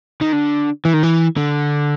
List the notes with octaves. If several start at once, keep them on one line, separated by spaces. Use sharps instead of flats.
D#3
D3
E3
D#3
E3
D3